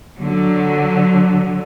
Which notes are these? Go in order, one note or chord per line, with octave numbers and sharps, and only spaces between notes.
D3 F#3